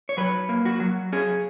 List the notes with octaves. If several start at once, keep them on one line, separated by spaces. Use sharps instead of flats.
C#5
F#3 B4
A#3
F#4
F#3
C#4 G#4